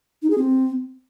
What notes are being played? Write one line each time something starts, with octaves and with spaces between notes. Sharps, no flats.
D#4
G#4
C4